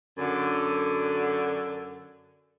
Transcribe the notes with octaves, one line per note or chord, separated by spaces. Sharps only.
F#2 D3